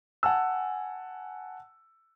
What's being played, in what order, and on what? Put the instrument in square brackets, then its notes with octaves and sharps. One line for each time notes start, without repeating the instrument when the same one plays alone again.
[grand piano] F#5 G#5 A5 E6